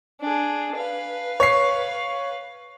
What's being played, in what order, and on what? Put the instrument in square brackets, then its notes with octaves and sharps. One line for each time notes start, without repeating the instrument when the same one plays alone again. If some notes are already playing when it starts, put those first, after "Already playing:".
[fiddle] D4 G#4
B4 F5
[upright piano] C#5 C7